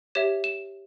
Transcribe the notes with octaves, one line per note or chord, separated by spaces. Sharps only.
G4 C#5 E5 E7
E7